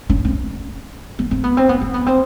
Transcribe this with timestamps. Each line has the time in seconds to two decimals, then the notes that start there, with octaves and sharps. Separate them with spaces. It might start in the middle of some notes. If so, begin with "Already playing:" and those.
0.10 C#4
0.25 C4
1.19 B3
1.31 C4
1.44 B3
1.57 C4
1.69 B3
1.81 C4
1.94 B3
2.06 C4